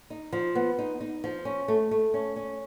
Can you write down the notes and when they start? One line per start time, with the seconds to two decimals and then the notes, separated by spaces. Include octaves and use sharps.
0.10 D#4
0.33 F3
0.55 B3
0.79 D#4
1.01 D#4
1.24 F3
1.45 C#4
1.68 A3
1.91 A3
2.14 C#4
2.36 C#4